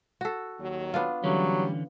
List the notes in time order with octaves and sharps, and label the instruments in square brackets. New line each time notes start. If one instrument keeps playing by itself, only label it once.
[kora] F#4 A4
[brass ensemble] D#2 D#3 F#3
[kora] B3 D4 F4
[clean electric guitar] D3 E3 C#4 [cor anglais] F#3 [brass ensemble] G3 A3